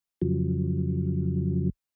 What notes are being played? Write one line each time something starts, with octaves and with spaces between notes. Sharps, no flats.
F2 C#3 F3 F#3